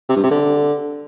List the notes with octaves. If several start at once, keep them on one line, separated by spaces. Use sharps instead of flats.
C3
G2
C3
D3